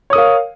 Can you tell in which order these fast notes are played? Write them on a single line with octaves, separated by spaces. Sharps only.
C#5 D#6 A#4 F5